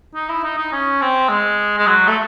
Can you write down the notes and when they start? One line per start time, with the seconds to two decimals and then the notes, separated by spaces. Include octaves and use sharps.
0.15 D#4
0.29 E4
0.44 D#4
0.57 D#4
0.72 C#4
1.02 C4
1.29 G#3
1.78 G#3
1.87 F#3
2.08 A3